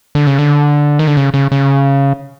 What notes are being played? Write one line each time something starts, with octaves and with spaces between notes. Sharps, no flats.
D3
C#3
D3
D#3
D3
C#3
C#3
C#3